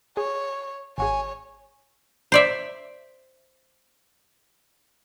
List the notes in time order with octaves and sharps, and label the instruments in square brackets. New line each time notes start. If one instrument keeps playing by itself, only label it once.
[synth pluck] G#4 [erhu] C#5
[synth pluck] G#1 F#4 G#4 [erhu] C#5 [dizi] G#5
[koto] C5 D5 E5